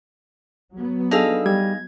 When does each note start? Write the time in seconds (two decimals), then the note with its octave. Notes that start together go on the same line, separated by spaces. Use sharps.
0.74 F#3 B3
1.11 D4 D#4 G#4 A4 F5 E6
1.46 G3 G#6